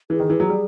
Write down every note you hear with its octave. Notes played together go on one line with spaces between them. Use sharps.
E3 G#4
D#3
E3
F#3
G3